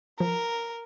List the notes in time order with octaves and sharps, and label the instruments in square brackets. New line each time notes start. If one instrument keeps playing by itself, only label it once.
[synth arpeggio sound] F3 [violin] A#4